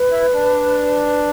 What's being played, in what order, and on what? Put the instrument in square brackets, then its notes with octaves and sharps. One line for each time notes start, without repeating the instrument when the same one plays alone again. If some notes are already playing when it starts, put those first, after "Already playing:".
Already playing: [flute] B4
[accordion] E4
D4